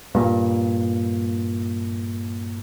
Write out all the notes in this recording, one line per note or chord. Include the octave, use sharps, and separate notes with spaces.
G2 A#2